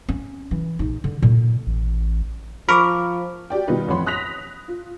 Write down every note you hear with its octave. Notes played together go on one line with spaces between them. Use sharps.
C#4
E3
A#1 D#4
D3
A#2 D3
A1
F3 A#4 B5 C#6 D6
F#4 G4 D5 G5
B2 D#3 G3 D#4 F4 B4
A1 F2 C#5 F#5 B5 C6
D#6 F#6 A#6 B6 F7
F4